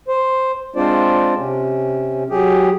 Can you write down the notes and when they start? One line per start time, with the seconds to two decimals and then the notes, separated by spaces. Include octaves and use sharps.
0.08 C5
0.76 G#3 C4 D4 F4 C5 D5
1.36 C3 C#4
2.30 F#3 G4 G#4